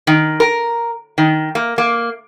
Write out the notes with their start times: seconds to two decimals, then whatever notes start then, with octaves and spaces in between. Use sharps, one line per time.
0.07 D#3
0.40 A#4
1.18 D#3
1.55 A#3
1.78 A#3